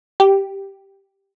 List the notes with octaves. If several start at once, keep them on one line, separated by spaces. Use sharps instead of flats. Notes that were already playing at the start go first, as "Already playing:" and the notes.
G4